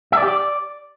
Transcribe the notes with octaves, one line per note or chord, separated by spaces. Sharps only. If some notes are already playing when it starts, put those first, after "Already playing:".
E5
D5
G4
D5